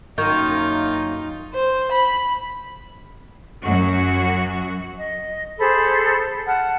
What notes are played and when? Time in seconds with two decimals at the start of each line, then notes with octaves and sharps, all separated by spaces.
0.18 F#2 D#3 A#3 D#4 F4 C#6 G6
1.54 C5
1.92 B5
3.62 F#2 F#4
4.98 D#5
5.59 G#4 A4 C5 B5
6.48 F#5 A5 F6